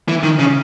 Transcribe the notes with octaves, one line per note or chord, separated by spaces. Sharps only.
E3
D#3
C#3